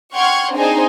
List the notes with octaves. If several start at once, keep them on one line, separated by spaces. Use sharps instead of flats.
F#5 G5 C6 C#6 F6 G#6
C4 D4 D#4 G#4 C5 G#5